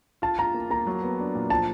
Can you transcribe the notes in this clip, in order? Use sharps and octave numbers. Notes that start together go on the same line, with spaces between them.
F4 A5
F4 A#5
A#3
A#3 A#5
F#3
B3
D4
A#2
F3 A5